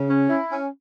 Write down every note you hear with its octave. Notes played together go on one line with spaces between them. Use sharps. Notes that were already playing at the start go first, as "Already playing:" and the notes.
Already playing: C#3
C#4
E4
C#4